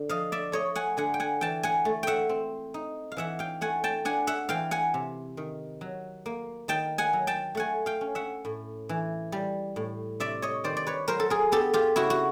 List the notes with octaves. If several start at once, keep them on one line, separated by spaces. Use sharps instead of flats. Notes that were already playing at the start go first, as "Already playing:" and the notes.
Already playing: D3
F3 D#5 F5
D5 E5
A3 C#5 D#5
F#5 G#5
D3 F#5 G#5
G5
F#5 G#5
E3 G5 A5
F#5 G#5
A3
E5 F#5 G5
C4
D#4
F5
E3 E5 F#5
F5 G5
A3 F#5 G#5
G5 A5
D4 F#5 G#5
E5 F#5
E3 F5 G5
F#5 G#5
C3
D#3
F#3
A#3
D#3 G5 A5
F#5 G#5
F#3
G5 A5
A3 F#5 G#5
F5 G5
C#4
E5 F#5
A2
E3
G3
A2
C3 D5 E5
C#5 D#5
D#3 C5 D5
D5
B4 C#5
F#3 A#4 C5
A4
G#4 A#4
B3 G4 A4
F4 G4
C#3 E4 F#4
F#4